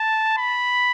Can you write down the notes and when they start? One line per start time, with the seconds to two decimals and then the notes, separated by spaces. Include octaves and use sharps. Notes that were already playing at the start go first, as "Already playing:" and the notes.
Already playing: A5
0.38 B5